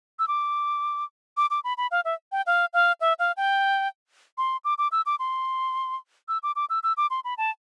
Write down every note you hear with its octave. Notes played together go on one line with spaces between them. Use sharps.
E6
D6
D6
D6
B5
B5
F5
E5
G5
F5
F5
E5
F5
G5
C6
D6
D6
E6
D6
C6
E6
D6
D6
E6
E6
D6
C6
B5
A5